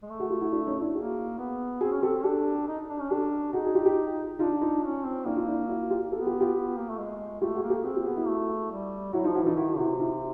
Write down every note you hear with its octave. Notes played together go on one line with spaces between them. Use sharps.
G#3
A3
F#4 G#4
F4 G4
E4 F#4
D4 E4
C#4 D#4
D4 E4
A#3 F#4 G#4
B3
C4 F#4 G#4
C#4
C4 G4 A4
D4 G4 A4
D#4
D4
C#4
D4 G4 A4
D#4 F#4 G#4
F#4 G#4
F4 G4
F4 G4
D4 D#4 F4
D#4 F4
C#4
C4
A#3 D4 E4
D#4 F4
D4 E4
E4 F#4
F4 G4
B3 G4 A4
F4 G4
F4 G4
B3
A#3
A3
G#3
A3 F4 G4
F#4 G#4
A#3
G4 A4
C4 F#4 G#4
F4 G4
B3 F#4 G#4
E4 F#4
A3
G3
F#3 E4 F#4
D#4 F4
F3
E4 F#4
E3 D#4 F4
D#3 E4 F#4
C3 E4 F#4
D#4 F4